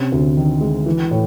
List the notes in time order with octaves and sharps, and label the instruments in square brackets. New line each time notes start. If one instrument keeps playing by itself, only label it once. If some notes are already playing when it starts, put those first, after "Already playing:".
Already playing: [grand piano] C3 C#4
D2
D#3
G#3
E3
A2